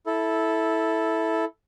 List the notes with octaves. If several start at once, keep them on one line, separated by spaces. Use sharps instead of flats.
E4 A4